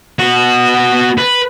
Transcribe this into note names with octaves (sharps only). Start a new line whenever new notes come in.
B3 F#4
B4